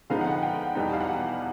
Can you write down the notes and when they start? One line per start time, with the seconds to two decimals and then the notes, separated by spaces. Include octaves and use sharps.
0.10 D3 F3 G#3 B3 D#4 F5
0.21 F#5
0.32 G5
0.43 G5
0.75 E2 B2 G3 B3 D#4
0.93 F5
1.01 F#5